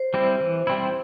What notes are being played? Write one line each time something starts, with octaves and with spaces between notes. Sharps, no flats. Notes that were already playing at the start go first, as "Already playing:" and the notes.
Already playing: C5
G3 C4 E4
E3
G3 C4 E4